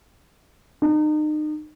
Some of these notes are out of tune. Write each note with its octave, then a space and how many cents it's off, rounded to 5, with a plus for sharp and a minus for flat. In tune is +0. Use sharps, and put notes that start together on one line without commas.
D#4 -35